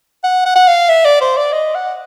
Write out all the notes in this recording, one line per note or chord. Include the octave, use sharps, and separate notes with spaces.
F#5
F#5
F#5
F5
E5
D5
C5
D5
D#5
F#5